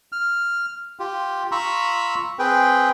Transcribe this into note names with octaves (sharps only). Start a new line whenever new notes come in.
F6
F4 G4
F4 A#5 B5 C#6 E6
C4 G#4 B4 G5